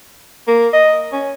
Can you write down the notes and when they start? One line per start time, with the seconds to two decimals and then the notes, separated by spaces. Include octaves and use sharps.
0.47 A#3
0.73 D#5
1.12 C#4